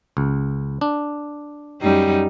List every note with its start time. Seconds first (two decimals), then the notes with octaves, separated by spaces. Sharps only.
0.17 C#2
0.81 D4
1.81 F#2 G3 D#4